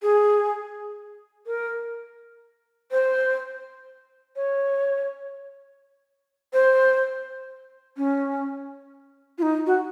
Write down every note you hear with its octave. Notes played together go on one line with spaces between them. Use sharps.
G#4
A#4
C5
C#5
C5
C#4
F4
D#4
F#4